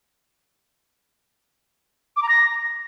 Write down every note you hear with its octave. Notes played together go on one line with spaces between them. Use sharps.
D6
A#5
A#6